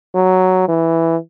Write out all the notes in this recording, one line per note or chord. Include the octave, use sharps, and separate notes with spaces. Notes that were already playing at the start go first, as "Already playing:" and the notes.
F#3
E3